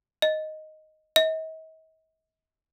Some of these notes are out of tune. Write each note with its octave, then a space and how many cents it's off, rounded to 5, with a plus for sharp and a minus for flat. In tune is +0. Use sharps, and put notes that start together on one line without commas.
D#5 +0
D#5 +45